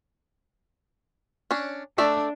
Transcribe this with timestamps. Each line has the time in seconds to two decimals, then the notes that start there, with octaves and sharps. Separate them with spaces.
1.51 C#4 D4
1.98 A3 D4 D5 E5